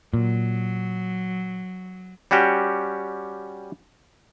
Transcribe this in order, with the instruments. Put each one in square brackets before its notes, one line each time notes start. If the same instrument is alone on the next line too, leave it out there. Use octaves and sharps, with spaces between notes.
[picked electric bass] A#2 [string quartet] F#3
[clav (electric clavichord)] G3 C#4 F#4 G4